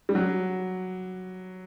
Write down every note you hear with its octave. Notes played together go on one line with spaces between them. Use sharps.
G3
F#3